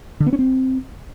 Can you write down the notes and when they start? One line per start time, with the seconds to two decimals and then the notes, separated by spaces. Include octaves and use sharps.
0.20 D3
0.26 B3
0.33 C#4
0.39 C4